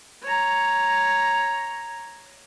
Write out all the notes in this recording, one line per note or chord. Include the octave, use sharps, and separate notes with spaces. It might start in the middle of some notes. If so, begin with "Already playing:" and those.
C#5 A#5